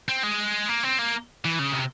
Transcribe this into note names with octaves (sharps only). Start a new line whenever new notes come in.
C4
G#3
A#3
C4
A#3
E3
C#3
C3